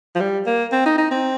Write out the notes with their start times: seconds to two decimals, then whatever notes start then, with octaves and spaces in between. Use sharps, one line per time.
0.15 F3
0.20 G3
0.46 A#3
0.72 C4
0.86 D#4
0.98 D#4
1.11 C4